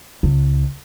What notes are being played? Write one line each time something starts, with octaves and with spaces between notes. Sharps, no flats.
C#2